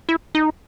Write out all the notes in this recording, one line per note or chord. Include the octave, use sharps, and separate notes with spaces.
E4
D#4